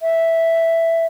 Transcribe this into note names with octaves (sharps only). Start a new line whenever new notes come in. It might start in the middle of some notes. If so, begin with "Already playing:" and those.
E5